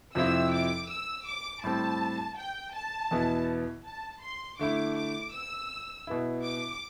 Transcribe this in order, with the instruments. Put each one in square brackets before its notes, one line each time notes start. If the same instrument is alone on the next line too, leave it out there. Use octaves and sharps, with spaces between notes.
[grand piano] F2 C3 F3 C4 E4 [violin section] E6
[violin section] D6
E6
D6
[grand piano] A2 G3 C4 [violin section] A5
[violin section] G5
A5
[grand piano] E2 B2 B3 E4
[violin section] A5
C6
[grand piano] D3 A3 E4 [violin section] D6
[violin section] D6
E6
[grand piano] B2 B3 E4
[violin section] D6